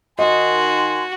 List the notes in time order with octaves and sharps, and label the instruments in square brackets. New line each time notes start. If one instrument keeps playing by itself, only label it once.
[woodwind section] D#3 G#5 C6 [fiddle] F#4 [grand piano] D#5